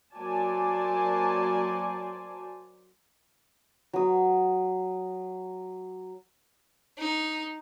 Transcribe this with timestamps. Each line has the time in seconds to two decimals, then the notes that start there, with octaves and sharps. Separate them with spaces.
0.14 F#3 A#3 C5 D5 G#5 A5
3.93 F#3 D#6
6.98 D#4